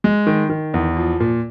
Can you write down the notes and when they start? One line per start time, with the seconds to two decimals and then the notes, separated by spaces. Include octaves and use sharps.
0.04 G#3
0.27 D#3
0.50 D#3
0.74 E2
0.97 F3
1.20 A#2